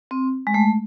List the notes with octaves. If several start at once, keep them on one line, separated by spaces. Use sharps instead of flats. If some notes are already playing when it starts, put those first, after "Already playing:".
C4
G#3
A3